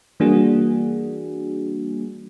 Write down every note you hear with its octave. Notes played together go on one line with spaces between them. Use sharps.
E3 G3 A#3 D4 F#4 G#4